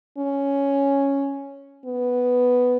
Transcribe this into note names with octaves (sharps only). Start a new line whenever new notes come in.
C#4
B3